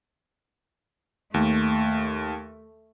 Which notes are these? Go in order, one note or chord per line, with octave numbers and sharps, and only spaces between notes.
D#2 A3